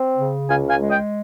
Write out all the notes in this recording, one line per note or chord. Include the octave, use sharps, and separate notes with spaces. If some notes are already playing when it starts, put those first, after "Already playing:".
Already playing: C4
C#3
C#2 F5 G#5
F5 G#5
G#3
D#5 G5